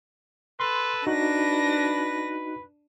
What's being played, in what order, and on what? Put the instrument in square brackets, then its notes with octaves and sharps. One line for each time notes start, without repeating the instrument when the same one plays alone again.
[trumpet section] A4 B4 [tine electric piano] C6
[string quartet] D4 A#6 [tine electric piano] D#4 F#4 [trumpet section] B4